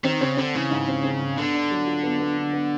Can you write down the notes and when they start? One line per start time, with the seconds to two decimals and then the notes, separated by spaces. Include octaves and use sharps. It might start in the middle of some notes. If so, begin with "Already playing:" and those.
0.04 D#3 C4
0.21 C#3 C4
0.37 D3 C4
0.55 C#3 E3
0.71 G#2
0.88 C4
1.04 C4
1.21 G#2
1.37 D3 B3
1.54 D4
1.71 F#3
1.87 F4
2.03 B3
2.20 B3
2.37 D4
2.53 B3